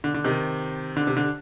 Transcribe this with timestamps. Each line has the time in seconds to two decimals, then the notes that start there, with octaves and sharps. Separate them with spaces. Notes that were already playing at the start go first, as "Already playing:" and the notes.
0.04 D3
0.14 D3
0.24 C3 D#3
0.97 D3
1.07 C3
1.17 D3